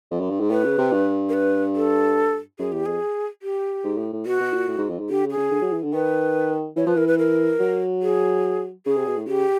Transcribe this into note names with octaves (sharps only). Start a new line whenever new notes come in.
F2
F#2
G2
G#2
A2 B4
C#3
C3
G2
A#4
B4
A4
F#2 G#4
E2 G4
F2 G#4
G4
G#2
A2
A2
B2 F#4
B2
A#2
A2
G#2
F2
G#2
D3 G4
C#3
G#4
C#3
D3
F#3
E3
D3
D#3 B4
E3 C#5
F3 B4
E3 A#4
B4
A#4
F#3
G#4
C#3 G#4
C3
B2
A2
C#3 G4